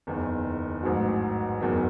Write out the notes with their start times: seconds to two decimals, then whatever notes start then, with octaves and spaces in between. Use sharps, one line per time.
0.07 F#1 E2 D#3
0.83 A1 G#2 F#3
1.61 F#1 E2 D#3 F#3